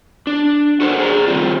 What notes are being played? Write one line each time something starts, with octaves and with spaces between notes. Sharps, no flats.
D4
F#4 A4 A#4 C5 F#5
G#4 D5 A5 A#5
D#3 E3 G3 A3 C4 F4